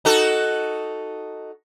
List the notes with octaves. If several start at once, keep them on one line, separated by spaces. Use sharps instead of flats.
D#4 F#4 A4